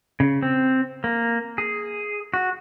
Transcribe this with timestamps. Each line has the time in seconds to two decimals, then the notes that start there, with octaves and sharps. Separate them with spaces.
0.20 C#3
0.42 C4
1.04 A#3
1.58 G#4
2.34 F#4